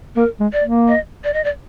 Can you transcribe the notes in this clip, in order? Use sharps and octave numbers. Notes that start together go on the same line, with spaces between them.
A#3 A#4
G#3
D5
A#3
D#5
D5
D#5
D5